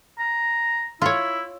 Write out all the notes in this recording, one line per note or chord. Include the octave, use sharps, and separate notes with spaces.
A#5
E4 F4 C#5